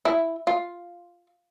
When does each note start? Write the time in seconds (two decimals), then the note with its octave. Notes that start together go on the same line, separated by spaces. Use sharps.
0.05 E4
0.47 F4